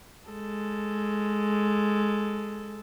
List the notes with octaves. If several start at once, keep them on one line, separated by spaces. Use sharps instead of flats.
G#3 A4